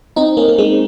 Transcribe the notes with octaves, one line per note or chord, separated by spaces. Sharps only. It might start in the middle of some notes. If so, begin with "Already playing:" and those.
C4 D#4
A#3 C#4
A#3
G#3 C4